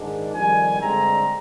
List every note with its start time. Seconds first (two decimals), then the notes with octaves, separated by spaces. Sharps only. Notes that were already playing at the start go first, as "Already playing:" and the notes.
Already playing: G#2 D#3 G#3 D4
0.33 F2 D#3 G3 G#5
0.79 G2 D3 G#3 C4 A#5